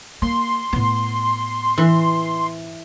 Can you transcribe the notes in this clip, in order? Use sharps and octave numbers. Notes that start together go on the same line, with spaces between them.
A#3 C6
A2 B3
E3